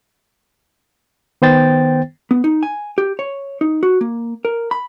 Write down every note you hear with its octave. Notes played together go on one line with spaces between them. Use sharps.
D#3 B3 C5 G5 A6
B3
D#4
G#5
G4
C#5
D#4
F#4
A#3
A#4
B5